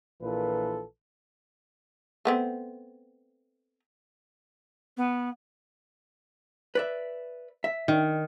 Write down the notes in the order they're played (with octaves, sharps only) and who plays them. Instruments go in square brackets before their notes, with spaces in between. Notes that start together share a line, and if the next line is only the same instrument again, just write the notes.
[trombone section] A#1 A#2 E3 F4 A4 B4
[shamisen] A3 B3 C4
[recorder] B3
[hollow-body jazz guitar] B4 D5 E5
E5
[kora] D#3